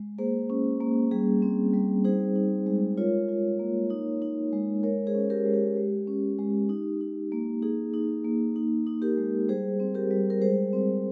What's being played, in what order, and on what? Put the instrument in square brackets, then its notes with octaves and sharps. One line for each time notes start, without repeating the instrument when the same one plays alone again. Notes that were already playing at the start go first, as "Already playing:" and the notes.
Already playing: [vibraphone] G#3
A#3 G#4 C5
C#4
A#3
G3 G#4
C4
G3
D#4 G#4 C5
D#4
G#3
F4 A#4 C#5
F4
A#3
D#4
D#4
G#3
G#3 A#4 C#5
G#4 C5
C#4
G4 A#4
G#3
G4
G#3
C#4
G#3
D#4
D#4
A#3
D#4 G#4
D#4
A#3
D#4
D#4
G4 A#4
G#3
G3 G#4 C5
C4
G4 A#4
G3
A#4
G#3 G#4 C5
C4